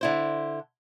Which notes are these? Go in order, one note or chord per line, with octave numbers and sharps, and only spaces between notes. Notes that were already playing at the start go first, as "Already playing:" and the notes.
D3 E4 C5